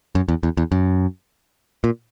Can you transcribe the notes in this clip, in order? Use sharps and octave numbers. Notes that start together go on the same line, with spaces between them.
F#2
E2
E2
E2
F#2
A#2